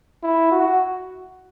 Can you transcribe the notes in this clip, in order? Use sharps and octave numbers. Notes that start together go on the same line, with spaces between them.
E4
F#4